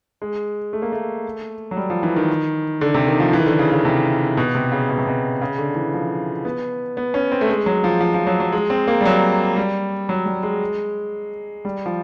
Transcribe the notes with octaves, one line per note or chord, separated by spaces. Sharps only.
G#3
A3
A#3
A3
F#3
G3
F3
E3
D#3
D3
C3
D#3
F3
E3
D#3
D3
C#3
C#3
C3
B2
C3
C#3
B2
C3
B2
C#3
D3
E3
F3
B3
B3
C#4
C4
A3
G#3
F#3
F3
F3
F3
F#3
F#3
G#3
C4
A#3
G3
F#3
G3
F#3
G3
G#3
G3
F3